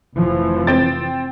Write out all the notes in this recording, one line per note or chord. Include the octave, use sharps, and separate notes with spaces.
F1 E3 F3
C4 G5 A6